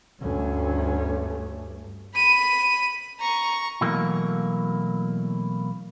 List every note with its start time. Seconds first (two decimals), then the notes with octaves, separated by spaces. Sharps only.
0.21 D2 G2 A3 C#4
2.15 B5 D#7
3.20 A#5 C#6
3.81 B2 E3 F#3 A3 A#3